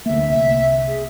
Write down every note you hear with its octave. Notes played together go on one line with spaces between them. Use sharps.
D2 A#3 E5
C2 E5
G#4